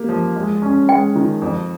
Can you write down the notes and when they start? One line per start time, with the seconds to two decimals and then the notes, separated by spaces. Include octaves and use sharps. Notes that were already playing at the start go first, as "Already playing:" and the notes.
Already playing: A#3 G4
0.09 F3
0.36 G#3
0.62 C#4
0.89 G#3 G5
1.15 D#3
1.42 F2